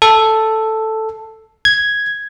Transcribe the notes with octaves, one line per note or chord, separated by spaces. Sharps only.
A4
G#6